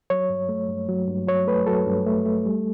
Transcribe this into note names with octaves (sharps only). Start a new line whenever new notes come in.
F#3 C#5
G2
A3
G2
F#3
G2
F#3 C#5
A3 B4
F#3 A4
G2
A3
A3
G3